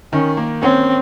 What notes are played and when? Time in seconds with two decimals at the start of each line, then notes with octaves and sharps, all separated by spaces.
0.13 D#3 C#4
0.37 A#3
0.62 C4 C#4